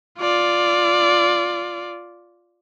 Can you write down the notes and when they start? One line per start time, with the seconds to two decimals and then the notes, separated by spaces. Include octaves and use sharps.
0.19 F4 D5